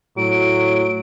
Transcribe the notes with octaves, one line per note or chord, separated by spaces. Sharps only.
A2 F#3 D7